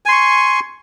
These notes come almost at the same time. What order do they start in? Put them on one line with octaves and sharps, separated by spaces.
G#5 C6 C#6